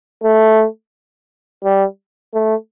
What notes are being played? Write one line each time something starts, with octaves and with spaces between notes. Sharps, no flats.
A3
G3
A3